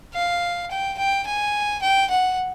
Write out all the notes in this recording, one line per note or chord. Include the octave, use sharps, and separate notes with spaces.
F5
G5
G5
G#5
G5
F#5